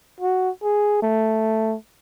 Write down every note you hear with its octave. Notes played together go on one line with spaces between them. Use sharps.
F#4
G#4
A3